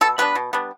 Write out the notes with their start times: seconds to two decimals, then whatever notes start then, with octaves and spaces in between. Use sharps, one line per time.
0.01 B2 A4
0.18 G3 B3 D4 B4
0.35 B2
0.53 G3 B3 D4